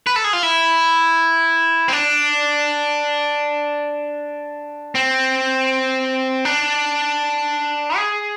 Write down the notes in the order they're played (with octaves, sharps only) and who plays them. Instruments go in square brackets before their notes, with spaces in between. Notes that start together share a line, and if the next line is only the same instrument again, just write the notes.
[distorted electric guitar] B4
A4
G#4
F4
E4
C4
D4
C4
D4
G#4